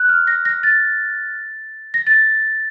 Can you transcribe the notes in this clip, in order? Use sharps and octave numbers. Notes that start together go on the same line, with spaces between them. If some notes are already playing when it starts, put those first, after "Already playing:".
Already playing: F#6
F6
A#6
A#6
A6
A#6
A6